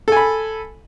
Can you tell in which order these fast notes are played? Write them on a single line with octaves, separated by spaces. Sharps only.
A4 G#5 B5